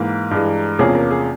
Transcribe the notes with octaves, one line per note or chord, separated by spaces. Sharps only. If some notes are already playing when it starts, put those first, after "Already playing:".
Already playing: G#2 E3 A#3 A#4
G2 E3 G#3
E2 C3 F3 A#3 C#4 G#4
A#4
G#4